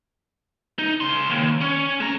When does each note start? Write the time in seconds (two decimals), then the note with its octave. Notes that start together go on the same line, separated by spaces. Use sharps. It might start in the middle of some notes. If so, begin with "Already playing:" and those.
0.79 D#4
1.00 C#3 C6
1.30 D#2
1.61 C#4
2.00 G#3 A#5